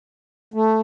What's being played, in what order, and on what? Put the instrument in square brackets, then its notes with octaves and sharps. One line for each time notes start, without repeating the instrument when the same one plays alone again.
[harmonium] A3